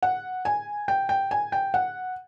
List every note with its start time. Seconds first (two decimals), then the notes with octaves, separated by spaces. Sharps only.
0.03 F#5
0.45 G#5
0.88 G5
1.09 G5
1.31 G#5
1.52 G5
1.74 F#5